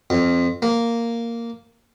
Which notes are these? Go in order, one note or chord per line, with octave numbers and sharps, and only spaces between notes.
F2
A#3